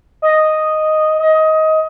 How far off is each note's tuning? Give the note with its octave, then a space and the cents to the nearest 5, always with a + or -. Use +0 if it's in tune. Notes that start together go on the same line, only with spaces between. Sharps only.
D#5 +0
D#5 +20